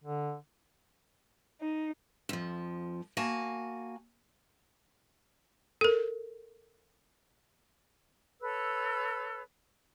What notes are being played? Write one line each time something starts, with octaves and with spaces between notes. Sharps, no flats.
D3
D#4
F2 F3
A#3 F#4 G#5 A5
A4 A#4
A4 B4 C#5 E6